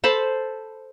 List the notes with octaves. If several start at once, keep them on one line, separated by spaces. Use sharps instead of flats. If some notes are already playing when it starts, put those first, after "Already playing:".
A4 C5 A5 B5